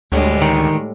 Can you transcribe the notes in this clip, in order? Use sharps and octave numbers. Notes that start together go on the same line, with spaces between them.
D2 A2 G3 G#3
D#3